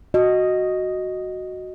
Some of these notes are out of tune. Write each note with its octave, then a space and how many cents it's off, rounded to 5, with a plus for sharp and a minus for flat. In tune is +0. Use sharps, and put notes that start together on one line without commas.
F#4 +0 D#5 +0